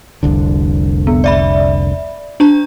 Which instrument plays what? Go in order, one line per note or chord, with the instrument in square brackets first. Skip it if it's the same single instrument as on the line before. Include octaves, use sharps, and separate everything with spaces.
[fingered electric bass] F1 C2 D3
[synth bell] B3
D5 E5 B5
D4 A#5